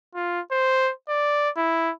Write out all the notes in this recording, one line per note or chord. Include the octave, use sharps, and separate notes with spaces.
F4
C5
D5
E4